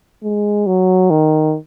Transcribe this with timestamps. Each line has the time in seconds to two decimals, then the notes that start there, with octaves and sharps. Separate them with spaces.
0.23 G#3
0.66 F#3
1.10 D#3